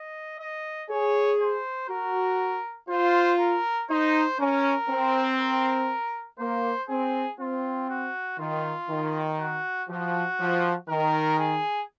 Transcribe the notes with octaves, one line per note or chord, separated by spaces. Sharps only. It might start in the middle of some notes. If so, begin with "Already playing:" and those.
Already playing: D#5
D#5
G#4 C#5
C5
F#4 A#4
F4 C5
A#4
D#4 C5
C#4 A#4
C4
A#4
A#3 C5
C4 G#4
C4 F4
F#4
D#3 F4
D#3
F#4
F3 F#4
F3
D#3 A#4
G#4